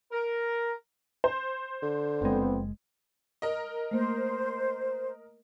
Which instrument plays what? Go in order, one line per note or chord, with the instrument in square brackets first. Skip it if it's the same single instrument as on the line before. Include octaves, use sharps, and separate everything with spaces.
[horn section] A#4
[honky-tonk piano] C5
[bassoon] D3
[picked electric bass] F#1 G#3 [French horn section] F2 B3 C4
[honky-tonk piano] A#4 D#5
[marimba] A3 A#3 [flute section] C5